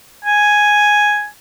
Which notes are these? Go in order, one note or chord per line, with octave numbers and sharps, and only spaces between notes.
G#5